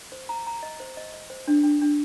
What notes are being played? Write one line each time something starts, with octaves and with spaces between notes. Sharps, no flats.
C5
A#5
A#5
D#5
C5
D#5
D#5
C5
D4
D4
D4